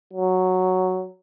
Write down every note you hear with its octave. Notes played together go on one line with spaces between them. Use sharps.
F#3